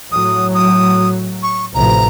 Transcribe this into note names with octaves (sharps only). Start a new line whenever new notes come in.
A2 F#3 D#6
D#6
C#6
A1 C3 F3 A#5